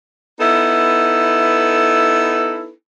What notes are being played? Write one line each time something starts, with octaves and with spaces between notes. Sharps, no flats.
B3 D#4 E4 A4 B4